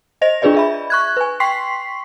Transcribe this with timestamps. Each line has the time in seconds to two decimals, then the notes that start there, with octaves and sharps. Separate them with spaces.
0.21 C5 D#5 A#6 F7
0.42 D4 F4 G#4 B4 D5 D#5
0.55 G#4 E5 B5
0.90 C#6 F#6 G#6
1.17 B4 G#5
1.40 G5 C6 C#6 B6 C7